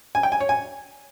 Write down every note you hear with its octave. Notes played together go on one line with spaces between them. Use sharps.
G#5
G5
G#5
C#5
G#5